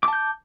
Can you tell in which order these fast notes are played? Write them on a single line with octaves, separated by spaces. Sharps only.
D6 A5 G6